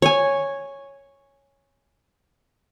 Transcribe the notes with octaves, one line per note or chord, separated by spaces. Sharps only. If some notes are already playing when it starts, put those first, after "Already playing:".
C#5 G#5